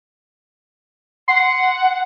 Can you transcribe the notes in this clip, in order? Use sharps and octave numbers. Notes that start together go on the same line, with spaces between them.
F#5 C6